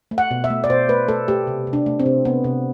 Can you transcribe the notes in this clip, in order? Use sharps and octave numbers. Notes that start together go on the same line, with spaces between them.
A3
F#5
B2
E5
A3
D5
B2 C5
A3 B4
A3 A4
A3 G4
C3
C3
D4
A3
C4
C3
C3 B3
C3